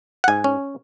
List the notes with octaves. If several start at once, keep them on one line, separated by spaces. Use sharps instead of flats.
F#5
G#2 G#5
C#4